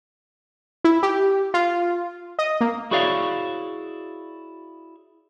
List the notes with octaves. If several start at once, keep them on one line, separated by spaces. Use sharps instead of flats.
E4
G4
F4
D#5
A#3
E4 F#4 G#4 C#5 D5 F5